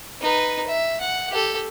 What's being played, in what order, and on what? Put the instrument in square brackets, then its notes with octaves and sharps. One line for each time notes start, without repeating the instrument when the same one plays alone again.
[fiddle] D#4 B4
E5
F#5
G4 A4